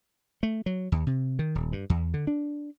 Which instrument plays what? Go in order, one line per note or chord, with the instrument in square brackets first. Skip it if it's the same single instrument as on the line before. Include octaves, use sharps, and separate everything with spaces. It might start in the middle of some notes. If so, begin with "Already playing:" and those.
[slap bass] A3
F#3
D#2
C3
D#3
D#1
G2
E2
D3
D4